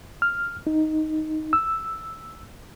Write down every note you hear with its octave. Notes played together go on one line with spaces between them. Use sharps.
F6
D#4
E6